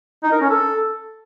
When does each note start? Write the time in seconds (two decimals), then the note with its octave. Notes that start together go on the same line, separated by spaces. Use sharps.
0.23 D#4
0.32 A#4
0.41 C#4
0.50 A4